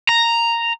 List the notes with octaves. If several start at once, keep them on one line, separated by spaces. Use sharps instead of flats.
A#5